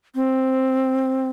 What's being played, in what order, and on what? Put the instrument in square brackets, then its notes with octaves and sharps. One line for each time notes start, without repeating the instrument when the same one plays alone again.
[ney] C4